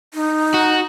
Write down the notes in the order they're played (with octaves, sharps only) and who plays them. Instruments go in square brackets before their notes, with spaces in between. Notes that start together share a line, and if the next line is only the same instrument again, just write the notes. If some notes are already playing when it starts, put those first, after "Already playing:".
[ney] D#4
[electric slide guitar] F#4